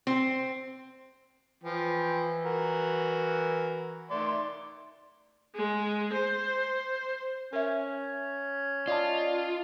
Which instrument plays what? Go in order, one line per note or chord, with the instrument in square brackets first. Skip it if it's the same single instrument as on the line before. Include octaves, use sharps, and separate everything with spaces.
[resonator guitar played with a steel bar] C4
[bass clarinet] E3 [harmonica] F3 G5
[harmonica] F#4 A#4
[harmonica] D#3 D5 C6 [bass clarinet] A3
[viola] G#3
C5
[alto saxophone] C#4 [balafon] A#4 E5
[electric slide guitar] F4 [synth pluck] D5 D#5 A5